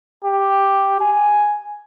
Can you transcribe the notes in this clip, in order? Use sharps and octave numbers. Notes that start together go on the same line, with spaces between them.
G4
G#5